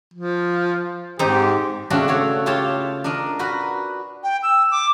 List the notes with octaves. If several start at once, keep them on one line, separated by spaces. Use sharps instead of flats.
F3
G#2 C4 D#4 G4
C#3 A3 C4 D4 F#4
F#4 A4 C#5
F4 G4 C#5 A5
D4 A#4 D#5
F#4 A#4 B4
G5
E6
D6